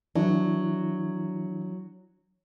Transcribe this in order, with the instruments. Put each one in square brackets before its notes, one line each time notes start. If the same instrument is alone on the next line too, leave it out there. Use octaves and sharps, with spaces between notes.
[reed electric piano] E3 D4 E4 [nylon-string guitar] F#3